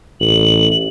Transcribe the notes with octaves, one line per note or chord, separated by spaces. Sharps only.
A1 F#7